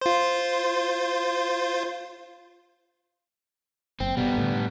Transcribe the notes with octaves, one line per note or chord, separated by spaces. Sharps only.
F4 C5
F#1 C4
B2 G3 B3
A2 D3